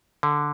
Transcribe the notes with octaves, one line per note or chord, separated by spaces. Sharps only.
D3